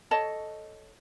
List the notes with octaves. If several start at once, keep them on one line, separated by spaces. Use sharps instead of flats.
A4 C#5 D#5 A5